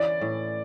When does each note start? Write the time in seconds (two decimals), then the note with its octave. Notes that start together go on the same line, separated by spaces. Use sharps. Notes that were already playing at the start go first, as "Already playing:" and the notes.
Already playing: E3 C#4 D5
0.21 A2